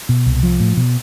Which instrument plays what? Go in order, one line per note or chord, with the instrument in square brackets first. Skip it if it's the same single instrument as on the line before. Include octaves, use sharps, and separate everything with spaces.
[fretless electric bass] B2
C2
F3
A2
B2